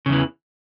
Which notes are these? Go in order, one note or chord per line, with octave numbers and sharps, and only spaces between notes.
E2 C#3 E3